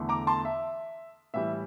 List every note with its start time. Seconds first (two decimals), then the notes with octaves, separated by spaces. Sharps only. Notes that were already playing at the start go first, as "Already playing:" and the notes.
Already playing: E2 D3 A3
0.09 A#5 D6
0.27 A5 C6
0.45 E5
1.34 A2 E3 G3 E5